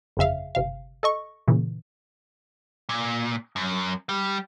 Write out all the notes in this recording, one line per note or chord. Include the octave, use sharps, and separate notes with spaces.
G1 F2 C#3 E5 F5
G1 C3 F5
A4 D#5 C#6
A#2 C#3 E3
A#2
F#2
G3